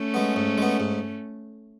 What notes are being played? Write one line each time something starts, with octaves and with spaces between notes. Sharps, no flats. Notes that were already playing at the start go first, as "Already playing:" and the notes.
Already playing: A3 C#4
G#3 B3
G#2
G#3 B3
G#2